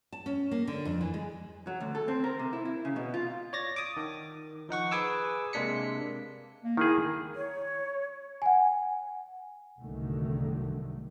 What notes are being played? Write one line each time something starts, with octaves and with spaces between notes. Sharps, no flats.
A5
C#4
A#3
D3
F2
E3
G#3
F#3
D2
A4
C4
A#4
C3
E4
E4
C#3
B2
F4
C#5 D5 A6 A#6
D6 D#6
D#3
F3 D#4 F#5 C#6
G#4 B4 G#5 D6 E6
C3 G#3 A#3 D4 B6 C#7
A#3
D#3 A#3 E4 G#4
C#5
F#5 G#5
C2 G#2 D3 D#3 F#3 A3